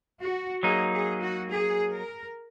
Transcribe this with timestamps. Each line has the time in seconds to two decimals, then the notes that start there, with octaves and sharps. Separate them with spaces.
0.20 F#4
0.63 F#3 A#3 D#4 G#4
0.92 G#4
1.21 F#4
1.50 G#4
1.94 A#4